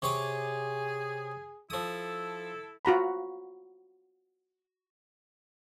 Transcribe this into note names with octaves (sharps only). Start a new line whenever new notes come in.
C3 G#4 C#5 D6
F3 E4 A4 D#6
F4 F#4 A#5 B5